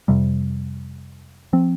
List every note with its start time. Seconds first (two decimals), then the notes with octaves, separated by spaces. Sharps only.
0.08 F2 C3 G3
1.53 F3 C4